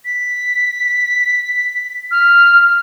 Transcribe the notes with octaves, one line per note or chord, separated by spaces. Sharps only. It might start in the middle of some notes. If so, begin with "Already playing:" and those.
B6
F6